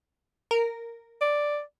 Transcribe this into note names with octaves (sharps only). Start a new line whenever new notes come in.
A#4
D5